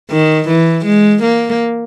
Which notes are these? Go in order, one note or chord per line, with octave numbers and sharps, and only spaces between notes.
D#3
E3
G#3
A#3